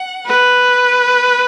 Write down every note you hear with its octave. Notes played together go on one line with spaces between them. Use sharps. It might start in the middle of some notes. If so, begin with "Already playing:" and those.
Already playing: F#5
B4